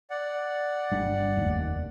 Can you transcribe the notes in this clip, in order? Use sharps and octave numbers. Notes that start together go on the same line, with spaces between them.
D5 F#5
G1 G3 D4
F1 D#2